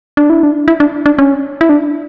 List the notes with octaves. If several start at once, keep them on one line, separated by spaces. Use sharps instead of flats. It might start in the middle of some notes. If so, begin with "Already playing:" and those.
D4
E4
D4
E4
D4
D4
C#4
E4
D4